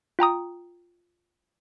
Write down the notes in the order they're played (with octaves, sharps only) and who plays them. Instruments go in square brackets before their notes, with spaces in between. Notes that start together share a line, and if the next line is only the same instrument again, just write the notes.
[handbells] F4 G5 A#5 D#6